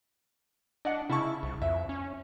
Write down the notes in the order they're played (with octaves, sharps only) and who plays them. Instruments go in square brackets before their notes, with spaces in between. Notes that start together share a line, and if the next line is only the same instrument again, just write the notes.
[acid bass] D4 [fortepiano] D#5 F#5
[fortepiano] C#3 A5 C#6 [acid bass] E4
[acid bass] C2
[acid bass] F2 [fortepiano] E5
[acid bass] C#4